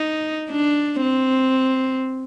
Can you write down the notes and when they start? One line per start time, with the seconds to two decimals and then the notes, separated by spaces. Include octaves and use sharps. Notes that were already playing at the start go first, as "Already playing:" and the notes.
Already playing: D#4
0.50 D4
1.02 C4